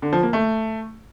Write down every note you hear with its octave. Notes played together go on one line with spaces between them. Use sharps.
D3
F3
A#3
A3